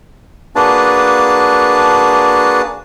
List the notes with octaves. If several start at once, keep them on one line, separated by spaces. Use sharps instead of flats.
A#3 D4 F#4 G#4 B4 A5